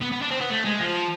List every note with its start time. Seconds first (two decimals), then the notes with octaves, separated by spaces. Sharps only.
0.01 B3
0.12 B3
0.22 D4
0.31 C4
0.41 B3
0.51 A3
0.65 G#3
0.80 F3